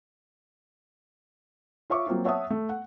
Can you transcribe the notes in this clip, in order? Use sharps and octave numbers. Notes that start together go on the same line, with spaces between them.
F4 C#5 E5 C#6 D6
F#3 A#3 C4 F4
C#5 E5 F#5 A5 D#6
A3
F#5